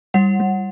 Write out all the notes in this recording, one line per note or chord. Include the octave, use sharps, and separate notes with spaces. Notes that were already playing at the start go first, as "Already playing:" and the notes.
G3 F#5
G3